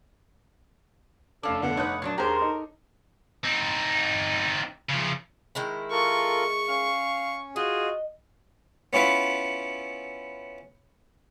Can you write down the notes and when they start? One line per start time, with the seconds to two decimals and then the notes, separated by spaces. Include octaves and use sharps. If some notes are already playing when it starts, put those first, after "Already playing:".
1.43 F1 C#4 D4 A4 F5 D6
1.62 D3 B3 A4 F#5
1.77 D#4 B4 C#5 D#6 F#6
2.02 A#2 F#3 D4
2.18 D#2 G4 G#4 A#4 C5 A#5
2.42 D#4 A4
3.44 C4 D#4
4.89 C#3 F3
5.55 D#3 G#3 E4
5.91 F4 A4 A#4 C#6
6.68 C#4 F5
7.56 F4 F#4 G#4 D#5
8.93 B3 C#4 E4 F4 B4